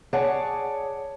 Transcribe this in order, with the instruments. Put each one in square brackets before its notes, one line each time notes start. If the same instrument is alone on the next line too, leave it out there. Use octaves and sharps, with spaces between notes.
[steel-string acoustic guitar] G#4 C#5 D5 F#5 A5